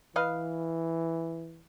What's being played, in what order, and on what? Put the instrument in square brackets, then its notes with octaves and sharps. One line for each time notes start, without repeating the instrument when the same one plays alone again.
[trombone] E3 [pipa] B4 D#5 F5